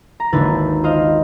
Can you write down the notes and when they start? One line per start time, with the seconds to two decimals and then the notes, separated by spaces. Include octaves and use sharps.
0.20 A#5
0.32 G#1 D#2 D3 E4 B4 A6
0.84 F4 C5 D#5 F5